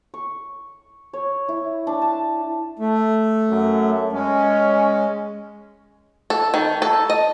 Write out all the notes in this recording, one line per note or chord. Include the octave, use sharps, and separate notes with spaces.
C#6
C#5
E4
D4
A5
A3
F#2
G#3 C#4
A4
D#3
A4
D#5